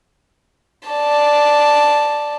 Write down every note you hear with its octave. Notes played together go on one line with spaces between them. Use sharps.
D5 A5